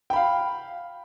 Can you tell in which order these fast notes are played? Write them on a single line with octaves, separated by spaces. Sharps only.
G5 B5 F5